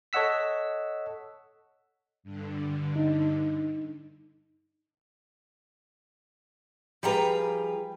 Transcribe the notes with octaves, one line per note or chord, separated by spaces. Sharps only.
A4 C#5 D#5 F#5 E6 B6
G2 D3
D#4
F3 G3 G#4 B4 G5 A#5